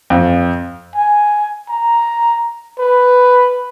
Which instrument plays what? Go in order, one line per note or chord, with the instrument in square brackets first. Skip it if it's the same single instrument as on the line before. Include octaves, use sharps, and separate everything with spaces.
[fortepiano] F2
[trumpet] G#5
A#5
B4